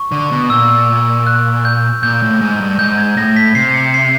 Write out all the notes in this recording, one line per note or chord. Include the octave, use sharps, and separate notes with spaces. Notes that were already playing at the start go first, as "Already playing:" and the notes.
Already playing: C#6
D3
B2
A#2 E6
F#6
G6
A#2 G6
A2
G#2
G2
G#2 G6
G#6
A2 A#6
B6
C3 C7
C#7
C7